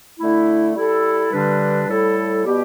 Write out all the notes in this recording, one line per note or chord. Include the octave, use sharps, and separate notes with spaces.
D3 A3 E4
G3 E4 A4
G2 D3 G3 D4 B4
A2 G3 E4 A4
B2 G3 B3 G4